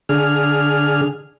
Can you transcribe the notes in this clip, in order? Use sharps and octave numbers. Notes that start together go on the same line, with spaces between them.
D3 G#4 F6